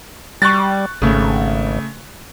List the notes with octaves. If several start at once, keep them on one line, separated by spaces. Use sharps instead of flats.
G3 C#6 F#6 A6
G#1 C#3 A3